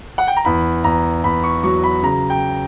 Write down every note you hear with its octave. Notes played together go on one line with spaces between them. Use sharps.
F#5
G5
A#5
E2 B5
E2 A#5
E2 B5
C#6
F#3 C#6
B5
C#3 A#5
G5